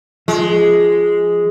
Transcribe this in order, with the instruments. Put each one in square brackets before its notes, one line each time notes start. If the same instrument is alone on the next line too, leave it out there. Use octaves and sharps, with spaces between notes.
[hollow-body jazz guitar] F3 [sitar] G#3